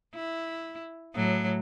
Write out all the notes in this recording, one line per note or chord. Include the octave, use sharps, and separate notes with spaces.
E4
A2 F#3